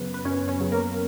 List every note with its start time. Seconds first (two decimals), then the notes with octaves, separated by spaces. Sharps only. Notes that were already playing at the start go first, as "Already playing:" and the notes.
Already playing: F#2 C#3 F#3 B3 B4
0.14 B4
0.25 F#2 C#4 C#5
0.48 C#4 C#5
0.60 C#3 F#3
0.72 A#3 A#4